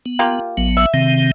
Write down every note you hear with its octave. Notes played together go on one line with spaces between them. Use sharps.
B3
A#3 F4 G4
A1 F#3 B3
E5
C3 D#3 C4